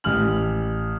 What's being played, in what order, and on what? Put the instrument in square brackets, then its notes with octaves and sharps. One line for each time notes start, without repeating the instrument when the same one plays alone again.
[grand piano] A1 G4 F6 F#7